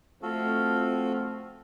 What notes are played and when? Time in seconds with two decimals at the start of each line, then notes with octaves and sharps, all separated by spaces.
0.23 F3 A3 C4 F#4 A4